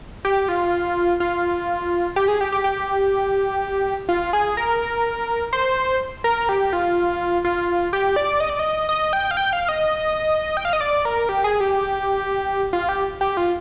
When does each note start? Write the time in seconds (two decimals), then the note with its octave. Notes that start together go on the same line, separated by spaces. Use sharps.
0.25 G4
0.48 F4
1.20 F4
2.16 G4
2.28 G#4
2.41 G4
2.52 G4
2.64 G4
4.09 F4
4.33 G#4
4.57 A#4
5.53 C5
6.24 A#4
6.49 G4
6.73 F4
7.44 F4
7.93 G4
8.16 D5
8.40 D#5
8.50 D5
8.59 D#5
8.89 D#5
9.13 G5
9.31 F5
9.37 G5
9.53 F5
9.69 D#5
10.57 G5
10.65 F5
10.73 D#5
10.81 D5
11.05 A#4
11.29 G4
11.44 G#4
11.60 G4
12.73 F4
12.89 G4
13.21 G4
13.37 F4